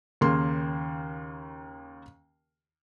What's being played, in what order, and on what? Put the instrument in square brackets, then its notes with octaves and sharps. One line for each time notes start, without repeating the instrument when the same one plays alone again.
[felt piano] D#2 C#3 A#3 C6